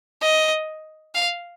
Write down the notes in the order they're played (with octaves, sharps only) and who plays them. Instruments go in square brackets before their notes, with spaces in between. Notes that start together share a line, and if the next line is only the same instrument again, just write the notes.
[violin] D#5
F5